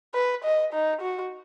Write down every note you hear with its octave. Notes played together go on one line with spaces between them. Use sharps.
B4
D#5
D#4
F#4